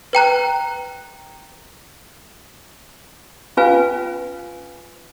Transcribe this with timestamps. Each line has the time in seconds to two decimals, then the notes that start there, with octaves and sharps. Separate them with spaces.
0.13 B4 G5 A#5 F#6
3.57 C#4 F4 B4 F5 G#5